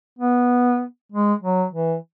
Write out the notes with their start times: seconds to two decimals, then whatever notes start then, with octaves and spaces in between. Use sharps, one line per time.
0.19 B3
1.12 G#3
1.43 F#3
1.73 E3